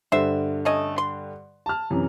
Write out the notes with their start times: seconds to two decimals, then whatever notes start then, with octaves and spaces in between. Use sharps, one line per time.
0.12 G2 D3 C5 E5
0.65 A3 C#4 D#5
0.98 C6
1.66 A5 F6
1.90 F#2 C3 E3